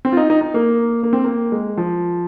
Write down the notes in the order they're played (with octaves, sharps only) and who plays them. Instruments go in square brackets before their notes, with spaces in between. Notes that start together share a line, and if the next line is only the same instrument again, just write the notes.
[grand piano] C4
F4
D#4
D#4
D#4
A#3
A#3
C4
A#3
G#3
F3